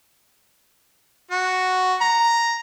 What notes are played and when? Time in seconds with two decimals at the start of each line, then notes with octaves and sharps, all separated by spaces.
1.31 F#4
2.01 A#5